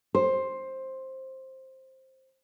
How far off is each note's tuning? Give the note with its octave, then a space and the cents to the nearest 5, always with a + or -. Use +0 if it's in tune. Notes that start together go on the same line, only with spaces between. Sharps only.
C5 +10